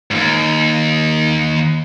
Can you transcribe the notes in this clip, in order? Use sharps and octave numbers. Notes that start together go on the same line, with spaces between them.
D#2 G#2